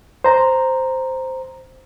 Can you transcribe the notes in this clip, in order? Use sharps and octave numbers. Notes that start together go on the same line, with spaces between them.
C5 A#5